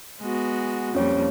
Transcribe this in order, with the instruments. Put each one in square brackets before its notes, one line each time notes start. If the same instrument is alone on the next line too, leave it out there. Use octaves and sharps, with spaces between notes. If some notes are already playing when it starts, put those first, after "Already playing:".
[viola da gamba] G#3 B3 F#4
[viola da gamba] F2 G3 A#3 [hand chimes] C#4 C#5